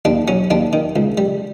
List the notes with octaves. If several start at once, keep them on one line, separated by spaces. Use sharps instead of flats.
D#2 D4
F#3 C#4
D#2 D4
D#3
C#2
G3